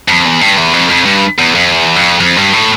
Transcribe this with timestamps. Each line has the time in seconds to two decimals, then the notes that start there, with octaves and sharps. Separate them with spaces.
0.08 F2
0.25 E2
0.41 G2
0.58 E2
0.73 F2
0.90 F2
1.06 G2
1.39 E2
1.55 F2
1.71 E2
1.96 F2
2.20 F2
2.37 G2
2.53 A2